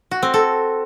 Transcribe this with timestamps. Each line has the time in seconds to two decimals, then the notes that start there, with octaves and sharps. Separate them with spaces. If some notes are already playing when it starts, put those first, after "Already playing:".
0.11 F#4
0.23 C4
0.34 A4